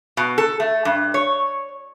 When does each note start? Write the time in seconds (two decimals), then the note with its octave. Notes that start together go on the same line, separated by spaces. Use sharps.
0.17 B2
0.38 A4
0.60 A3
0.85 G2
1.14 C#5